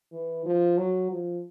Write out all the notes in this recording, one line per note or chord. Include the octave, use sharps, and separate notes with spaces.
E3
F3
F#3
F3